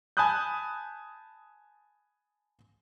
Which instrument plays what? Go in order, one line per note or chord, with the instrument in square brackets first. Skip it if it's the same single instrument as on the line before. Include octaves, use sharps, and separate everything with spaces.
[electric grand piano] G#5 A5 B5 D#6 F#6 G6